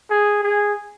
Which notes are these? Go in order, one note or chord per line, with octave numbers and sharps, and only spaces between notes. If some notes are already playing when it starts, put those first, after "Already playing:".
G#4
G#4